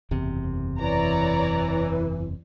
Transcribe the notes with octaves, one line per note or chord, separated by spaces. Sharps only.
F#1 E2 C3
E3 C#5 D5 A#5